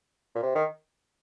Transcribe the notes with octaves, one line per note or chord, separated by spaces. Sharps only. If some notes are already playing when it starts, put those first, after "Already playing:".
A#2
C3
D#3